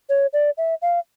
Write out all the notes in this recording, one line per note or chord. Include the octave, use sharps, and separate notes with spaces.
C#5
D5
E5
F5